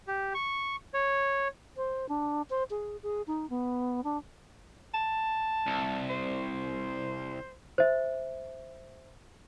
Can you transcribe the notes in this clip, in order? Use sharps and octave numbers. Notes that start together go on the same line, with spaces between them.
G4
C#6
C#5
C5
D4
C5
G#4
G#4
D#4
B3
D4
A5
C2
C5
C5 E5